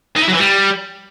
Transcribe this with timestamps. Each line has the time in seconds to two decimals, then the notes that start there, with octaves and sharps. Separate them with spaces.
0.16 D#4
0.22 E4
0.28 F#3
0.33 E3
0.39 G3